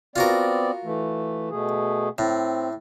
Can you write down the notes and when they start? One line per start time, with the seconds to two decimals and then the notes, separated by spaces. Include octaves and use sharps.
0.16 B3 C4 F4 F#4 A#4 D5
0.84 E3 A3
1.51 B2 A3 G#4
2.18 A2 C4